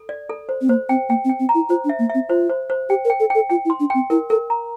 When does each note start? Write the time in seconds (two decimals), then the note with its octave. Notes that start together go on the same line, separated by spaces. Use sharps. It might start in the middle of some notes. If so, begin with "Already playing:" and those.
Already playing: A4
0.09 D5
0.30 A4
0.49 C5
0.61 C4
0.69 A#3 C5
0.89 C4 G5
1.09 A#3 G5
1.25 C4
1.29 G5
1.40 C4
1.49 A#5
1.55 E4
1.69 F4 C5
1.85 D4
1.89 E5
1.99 A#3
2.10 C4 E5
2.29 F4 C5
2.49 C5
2.70 C5
2.89 G4 G5
3.05 A#4
3.10 G5
3.20 A4
3.30 A4 G5
3.50 F4 G5
3.65 E4
3.70 C6
3.80 D4
3.90 C4 G5
4.10 E4 A#4
4.30 A4 A#4
4.50 A#5